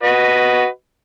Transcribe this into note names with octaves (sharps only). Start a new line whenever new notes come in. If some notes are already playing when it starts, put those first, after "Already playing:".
F#4 B4 D#5